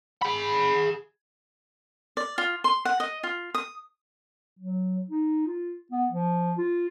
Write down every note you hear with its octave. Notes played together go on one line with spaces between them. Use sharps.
G#4 B5
D5
F4
C6
F#5
D#5
F4
D#6
F#3
D#4
F4
B3
F3
F4